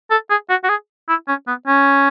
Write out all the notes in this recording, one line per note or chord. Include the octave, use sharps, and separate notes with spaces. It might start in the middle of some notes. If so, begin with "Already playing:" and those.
A4
G#4
F#4
F#4
G#4
E4
C#4
B3
C#4